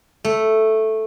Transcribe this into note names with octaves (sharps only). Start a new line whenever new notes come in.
A3